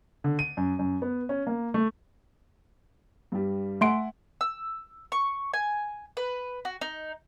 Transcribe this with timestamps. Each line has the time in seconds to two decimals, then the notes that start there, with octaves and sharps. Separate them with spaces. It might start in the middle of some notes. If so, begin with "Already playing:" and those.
0.24 D3
0.39 D#7
0.57 F#2
0.79 F#2
1.02 B3
1.29 C#4
1.47 A#3
1.74 A3
3.32 G2 G3
3.81 A3 E5 F#5 G#5 C6 D7
4.41 E6
5.12 C#6
5.54 G#5
6.17 B4
6.65 F#4
6.81 D#4